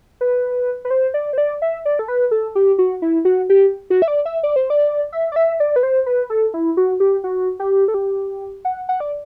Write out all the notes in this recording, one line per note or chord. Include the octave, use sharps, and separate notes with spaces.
B4
B4
C5
D5
C5
D5
E5
D5
A4
B4
A4
G4
F#4
E4
F#4
G4
F#4
E5
D5
E5
D5
C5
D5
E5
D5
E5
D5
B4
C5
B4
A4
E4
F#4
G4
F#4
G4
A4
G4
F#5
F#5
D5